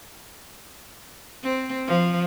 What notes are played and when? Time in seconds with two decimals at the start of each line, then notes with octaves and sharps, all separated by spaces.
1.43 C4
1.87 F3